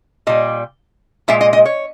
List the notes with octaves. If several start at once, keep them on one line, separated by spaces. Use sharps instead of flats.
A#2 G3 D#5
A#2 G#3 E5
D#5
D#5
C#5